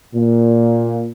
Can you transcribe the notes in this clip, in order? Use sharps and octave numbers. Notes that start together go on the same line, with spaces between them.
A#2